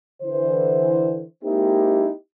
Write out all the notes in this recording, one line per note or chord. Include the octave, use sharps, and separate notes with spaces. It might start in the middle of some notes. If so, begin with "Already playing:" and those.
D3 E3 C5
G#3 A#3 C4 D#4 E4 G4